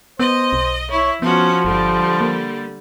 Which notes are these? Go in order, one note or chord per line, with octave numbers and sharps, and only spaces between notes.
B3 C5 D#5
B1
E4 C#5
F3 B3 C#4 F#4
G1 D3 G3
A#3